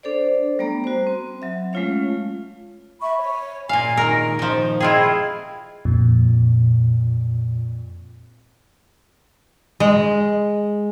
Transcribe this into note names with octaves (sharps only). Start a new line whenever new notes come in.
D4 A4 C5 D5
G3 A3 B3 A#5
F#4 C5
C4
F#3 E5
G#3 A3 C#4 F4 C#5 F5
E5 B5 C#6
C#5
A#2 F5 G#5
D#3 A#4 D#5
D#3 F3
E4 F4 G#4 D#5 G5
F2 A#2
G#3